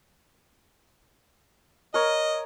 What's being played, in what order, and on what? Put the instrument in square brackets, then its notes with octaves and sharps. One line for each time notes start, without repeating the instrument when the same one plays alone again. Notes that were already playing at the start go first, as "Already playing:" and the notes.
[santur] A#4 C#5 [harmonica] D#5